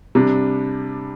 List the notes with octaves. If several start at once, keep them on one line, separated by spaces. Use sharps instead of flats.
C3 G3 D4